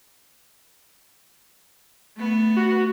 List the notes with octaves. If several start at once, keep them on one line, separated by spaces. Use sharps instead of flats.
A3 B3
F#4